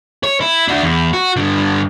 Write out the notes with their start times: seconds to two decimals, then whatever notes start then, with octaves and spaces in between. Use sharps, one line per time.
0.23 C#5
0.41 E4
0.68 D4 F#4
0.82 E2
1.13 F#4
1.36 G2 D3